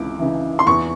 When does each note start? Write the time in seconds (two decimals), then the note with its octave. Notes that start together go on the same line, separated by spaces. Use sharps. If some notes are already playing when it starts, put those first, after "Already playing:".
Already playing: C#2 E3 D6
0.19 C#3 E3
0.59 C6
0.67 E2 C#6